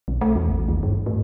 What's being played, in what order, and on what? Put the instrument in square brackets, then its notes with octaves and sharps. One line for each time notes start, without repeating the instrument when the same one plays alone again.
[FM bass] B1
A3
E2
A1
D#2
G2
A2